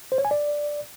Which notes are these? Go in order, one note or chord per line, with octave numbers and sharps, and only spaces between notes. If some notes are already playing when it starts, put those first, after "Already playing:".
C5
C#5
G#5
D5